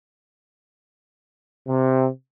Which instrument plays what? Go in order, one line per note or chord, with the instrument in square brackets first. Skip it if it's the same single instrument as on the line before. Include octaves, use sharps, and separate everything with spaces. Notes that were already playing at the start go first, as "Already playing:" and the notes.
[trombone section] C3